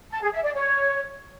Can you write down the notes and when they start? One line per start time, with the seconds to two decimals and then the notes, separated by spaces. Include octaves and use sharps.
0.11 A5
0.22 G#4
0.33 E5
0.44 D5
0.54 C#5